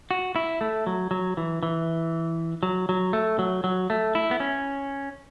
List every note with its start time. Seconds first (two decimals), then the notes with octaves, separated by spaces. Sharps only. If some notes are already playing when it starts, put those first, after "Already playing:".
0.11 F#4
0.36 E4
0.61 A3
0.87 F#3
1.11 F#3
1.37 E3
1.63 E3
2.63 F#3
2.89 F#3
3.13 A3
3.39 F#3
3.64 F#3
3.90 A3
4.15 E4
4.31 B3
4.40 C#4